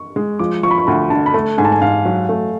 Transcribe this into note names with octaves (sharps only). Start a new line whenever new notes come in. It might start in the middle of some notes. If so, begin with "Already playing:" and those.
Already playing: C#6
G#3
F3 D6
F3 C#6
B5
C#6
D2 B5
D3 A5
B5
A3 A5
G#2 G#5
A5
G#5
G#2 F5
F#3
A3